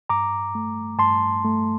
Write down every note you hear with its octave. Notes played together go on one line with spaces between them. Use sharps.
G2 A#5 D6
A3
G2 A5 C6
A3